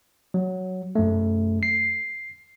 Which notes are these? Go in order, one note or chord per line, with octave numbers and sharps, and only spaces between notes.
F#3
F#2 A3
C7